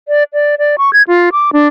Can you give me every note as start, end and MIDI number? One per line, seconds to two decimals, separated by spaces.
0.08 0.23 74
0.33 0.55 74
0.59 0.76 74
0.78 0.93 85
0.93 1.02 92
1.08 1.30 65
1.32 1.50 86
1.53 1.68 62